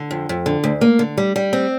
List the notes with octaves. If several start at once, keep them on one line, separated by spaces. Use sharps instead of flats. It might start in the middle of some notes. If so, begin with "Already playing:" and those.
Already playing: D3
F2
F2
D3
D2
A#3
D3
G3
G3
C4